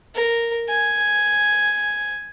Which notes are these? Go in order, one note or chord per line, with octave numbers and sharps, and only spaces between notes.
A#4
G#5